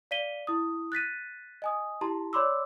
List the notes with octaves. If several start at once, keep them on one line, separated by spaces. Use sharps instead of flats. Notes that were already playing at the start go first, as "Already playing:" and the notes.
D5 F5 B6 D#7 G7
E4 D#6
F#6 A6 B6 D#7
D#5 G#5 D#6
E4 G4 A5 A#5 C6
C#5 D5 B5 C6 D6 E6